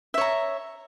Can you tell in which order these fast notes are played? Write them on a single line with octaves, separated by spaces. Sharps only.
E5 C#5 A#5